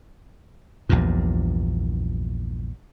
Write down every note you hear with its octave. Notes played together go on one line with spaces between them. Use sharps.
A#1 E2 G2 A#2